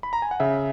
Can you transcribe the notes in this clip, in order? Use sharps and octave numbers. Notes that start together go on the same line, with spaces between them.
B5
A#5
G#5
F#5
C#3 E5